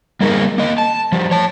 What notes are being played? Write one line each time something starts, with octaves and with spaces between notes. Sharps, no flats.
G3 A#3 D#4 G#4 A#4
A#3 D#5
A5
F3 G3
C#5 A5